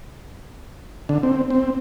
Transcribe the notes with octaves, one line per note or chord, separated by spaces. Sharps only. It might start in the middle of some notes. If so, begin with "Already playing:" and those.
D3
C4
C4